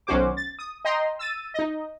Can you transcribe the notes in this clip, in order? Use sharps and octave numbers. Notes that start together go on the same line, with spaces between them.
B1 D#3 C#4 F#4 C5 D6
A6
D#6
D#5 G5 A#5 C6
E6 A6 D#7
D#4 D#5